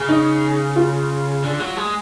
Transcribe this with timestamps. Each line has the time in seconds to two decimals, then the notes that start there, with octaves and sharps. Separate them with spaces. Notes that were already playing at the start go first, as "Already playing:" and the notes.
Already playing: C#3
0.09 D#4
0.76 F4
1.44 D3
1.60 F#3
1.77 G#3